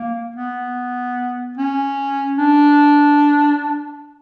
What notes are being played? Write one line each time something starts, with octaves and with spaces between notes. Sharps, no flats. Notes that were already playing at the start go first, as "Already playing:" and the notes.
Already playing: A#3
B3
C#4
D4